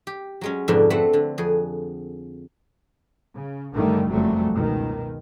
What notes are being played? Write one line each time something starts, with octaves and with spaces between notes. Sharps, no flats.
G4
F#3 G#3 C#4
F2 G#2 B2 D3 D4
A3 C4 B4 F#5
D3
F2 G#4
C#3
G2 D3 D#3 G3 A3
F#1 F2 F#3 G3 A3
C#2 B2 D#3